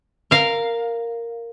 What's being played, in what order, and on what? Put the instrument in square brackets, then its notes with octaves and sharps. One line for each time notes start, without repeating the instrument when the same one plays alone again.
[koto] A#4 F5